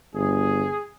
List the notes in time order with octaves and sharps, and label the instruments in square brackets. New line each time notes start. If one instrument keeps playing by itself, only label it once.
[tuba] G1 [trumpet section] G#4